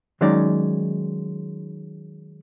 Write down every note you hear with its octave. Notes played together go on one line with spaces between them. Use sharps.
D#3 F#3 G#3 C#4 D#4 D5